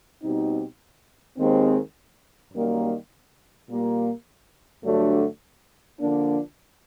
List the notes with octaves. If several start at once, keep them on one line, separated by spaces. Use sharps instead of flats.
B2 G3 C4 D#4
D#2 D#3 G#3 C4
F#2 D#3 G3 A#3
A#2 G3 A#3
G2 D3 F#3 A3 D4
D3 F3 A#3 D4